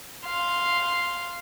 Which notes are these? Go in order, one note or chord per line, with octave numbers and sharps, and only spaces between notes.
F5 C6